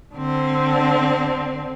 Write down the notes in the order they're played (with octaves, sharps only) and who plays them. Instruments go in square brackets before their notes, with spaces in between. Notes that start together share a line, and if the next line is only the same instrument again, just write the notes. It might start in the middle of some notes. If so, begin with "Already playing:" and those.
[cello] D3 C4